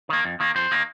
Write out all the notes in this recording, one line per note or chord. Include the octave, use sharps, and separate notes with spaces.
D#3 A#3
F2
D#3 A#3
F2 C5
D#3 A#3